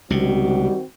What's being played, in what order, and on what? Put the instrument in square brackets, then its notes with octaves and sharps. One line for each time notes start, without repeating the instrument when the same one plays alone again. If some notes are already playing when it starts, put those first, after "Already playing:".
[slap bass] C#2 C3 [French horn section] D#3 C4 F#4 [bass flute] G3